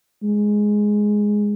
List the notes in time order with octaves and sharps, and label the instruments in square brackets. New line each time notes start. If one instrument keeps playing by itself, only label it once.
[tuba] G#3